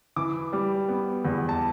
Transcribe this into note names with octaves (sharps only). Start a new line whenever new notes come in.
E3 D6
G3
B3
E2
A5